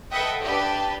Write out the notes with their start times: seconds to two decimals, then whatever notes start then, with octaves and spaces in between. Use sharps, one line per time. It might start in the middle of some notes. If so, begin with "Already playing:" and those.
0.10 A4 B4 D#5 E5 F#5 G5
0.41 D4 G4 B4 A5